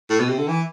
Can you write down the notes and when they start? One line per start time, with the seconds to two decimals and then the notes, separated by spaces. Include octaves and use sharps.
0.10 A2
0.20 B2
0.29 C3
0.39 D3
0.49 E3